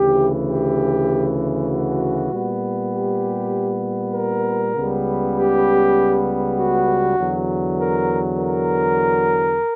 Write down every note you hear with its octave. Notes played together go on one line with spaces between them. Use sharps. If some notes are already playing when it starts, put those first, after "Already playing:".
Already playing: D2 C#3 E3 G4
G4
F#4
A#2 G3 B3
G4
A#4
C#2 C#3 G3 B3
G4
F#4
E2 D3 F#3
A#4
A#4